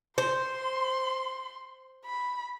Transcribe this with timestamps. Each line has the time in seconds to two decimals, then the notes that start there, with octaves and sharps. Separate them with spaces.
0.18 C5 C6
2.05 B5